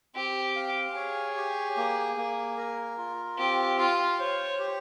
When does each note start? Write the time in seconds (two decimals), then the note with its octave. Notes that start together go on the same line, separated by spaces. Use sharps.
0.15 C4 G4
0.56 F5
0.96 G#4 C#5
1.37 G4
1.77 A#3
2.17 A#3
2.57 A#4
2.98 F4
3.39 C4 G4
3.78 F4 F5
4.19 C5 C#5
4.59 G4